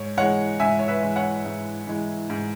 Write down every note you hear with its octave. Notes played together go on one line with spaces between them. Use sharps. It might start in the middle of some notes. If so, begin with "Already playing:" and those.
Already playing: G#2 C#5
E3 G#3 C#5 F#5
G#2 E5 G#5
C#5
B4 E5
E3 G#3
C#5 F#5
G#2
E3 G#3
G#2